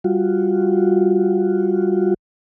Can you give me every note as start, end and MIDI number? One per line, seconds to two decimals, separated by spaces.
0.04 2.14 55
0.04 2.14 65
0.04 2.14 66